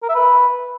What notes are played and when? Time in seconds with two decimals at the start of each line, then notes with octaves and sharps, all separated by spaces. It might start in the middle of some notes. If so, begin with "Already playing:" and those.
0.03 A#4
0.09 E5
0.15 B4